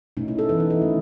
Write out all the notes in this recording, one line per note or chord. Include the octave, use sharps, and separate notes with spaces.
B2 A3 C#4 D#4
E4
A4
E3 B3 B4
D#4
E4
D#3 A3 C#4